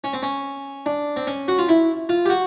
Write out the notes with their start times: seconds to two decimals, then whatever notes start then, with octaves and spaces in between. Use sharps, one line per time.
0.04 C#4
0.13 C4
0.23 C#4
0.86 D4
1.16 C4
1.27 C#4
1.48 F#4
1.58 F4
1.69 E4
2.09 F4
2.26 G4
2.29 F#4